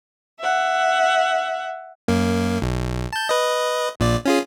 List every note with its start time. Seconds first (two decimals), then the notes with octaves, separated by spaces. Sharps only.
0.40 E5 F#5
2.08 F#2 A#3
2.62 B1
3.13 A5 G6
3.29 B4 D#5
4.00 A#1 A#2 D5
4.25 C#4 F4 G#4